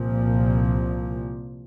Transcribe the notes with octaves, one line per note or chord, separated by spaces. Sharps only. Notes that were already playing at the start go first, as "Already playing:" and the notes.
Already playing: C2 A#2 F3